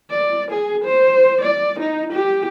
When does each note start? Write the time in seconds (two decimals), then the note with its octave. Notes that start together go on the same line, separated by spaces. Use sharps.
0.10 D5
0.52 G#4
0.85 C5
1.42 D5
1.80 D#4
2.13 G4